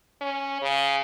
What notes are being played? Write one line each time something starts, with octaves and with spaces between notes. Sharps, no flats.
C#4
C#3